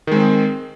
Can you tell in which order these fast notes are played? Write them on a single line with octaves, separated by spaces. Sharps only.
D#3 G#3 C4